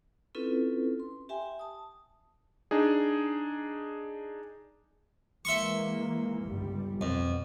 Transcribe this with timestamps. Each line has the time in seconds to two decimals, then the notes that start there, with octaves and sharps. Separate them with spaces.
0.35 C4 C#4 E4 F4 A4 B4
1.00 C6
1.29 G4 E5 G5 G#5 C6
1.59 A5 D#6
2.71 D4 D#4 G#4
5.45 E3 G#3 A#3 E5 C6 C#6
6.44 G1 C#2 G3
7.01 F2 B2